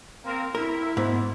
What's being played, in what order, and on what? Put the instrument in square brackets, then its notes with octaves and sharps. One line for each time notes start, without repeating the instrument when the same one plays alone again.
[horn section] A#3 C4 A#4
[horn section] E4 [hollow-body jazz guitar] A#4
[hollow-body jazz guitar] G#2 B3